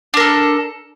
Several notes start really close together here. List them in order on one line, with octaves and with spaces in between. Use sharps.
D4 A#4 A4